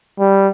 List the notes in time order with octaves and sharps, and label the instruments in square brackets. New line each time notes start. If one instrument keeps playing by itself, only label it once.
[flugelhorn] G3